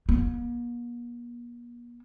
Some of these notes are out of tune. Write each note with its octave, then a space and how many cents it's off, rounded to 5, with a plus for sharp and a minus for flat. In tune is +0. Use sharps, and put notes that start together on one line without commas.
A#3 +45